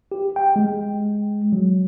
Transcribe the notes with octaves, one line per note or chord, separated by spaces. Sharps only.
G4
G5
G#3
F#3